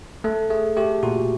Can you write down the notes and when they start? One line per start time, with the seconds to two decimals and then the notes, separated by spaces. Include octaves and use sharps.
0.24 A3 A4
0.50 A3 G#4
0.76 A3 G4
1.03 A#2 F#4